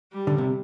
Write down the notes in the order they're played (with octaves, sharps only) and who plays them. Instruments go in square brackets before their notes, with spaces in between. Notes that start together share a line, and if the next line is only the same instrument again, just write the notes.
[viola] G3
[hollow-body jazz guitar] D3
C3